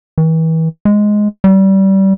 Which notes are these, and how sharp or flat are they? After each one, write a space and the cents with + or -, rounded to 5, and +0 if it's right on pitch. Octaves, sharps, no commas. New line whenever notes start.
E3 -35
G#3 +5
G3 -25